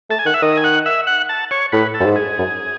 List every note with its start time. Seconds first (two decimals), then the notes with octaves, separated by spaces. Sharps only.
0.10 A3 A5
0.19 G#5
0.26 D#3 F#5
0.34 E5
0.42 D#3 D#5
0.57 G#5
0.64 F#5
0.86 E5
1.07 F#5
1.29 A5
1.51 C#5
1.72 A2 B4
1.94 A4
2.00 F#2
2.06 G#2
2.16 G#4
2.38 F#2